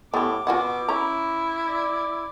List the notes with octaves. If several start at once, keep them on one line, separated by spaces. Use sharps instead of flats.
A2 B3 G4 D6
B2 F4 F#4 F#5
C#4 E4 A#5
D5